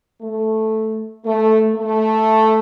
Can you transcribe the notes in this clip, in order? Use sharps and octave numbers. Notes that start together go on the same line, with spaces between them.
A3
A3
A3